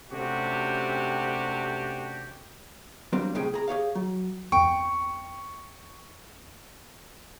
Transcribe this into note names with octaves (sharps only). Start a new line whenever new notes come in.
C3 A3 C#4 D4 F#4 G4
F#3 G3 A#3 C4 D4
C2 A2 C3 C#4 G#4 G5
G#4 A#5
G4 G#4 C#5 F5
F#3
E2 C4 G5 C#6